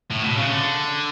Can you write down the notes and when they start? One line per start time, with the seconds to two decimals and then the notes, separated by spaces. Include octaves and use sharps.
0.11 A2
0.24 B2
0.37 C#3
0.50 D3